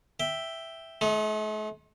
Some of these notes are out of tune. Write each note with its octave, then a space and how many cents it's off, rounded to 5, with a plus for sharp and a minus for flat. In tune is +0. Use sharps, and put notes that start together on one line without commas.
E5 +0 G5 +0
A3 -45 D#4 +10